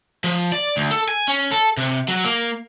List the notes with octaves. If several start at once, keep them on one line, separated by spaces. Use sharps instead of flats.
F3
D5
D2
A4
G#5
C#4
A4
C3
F#3
A#3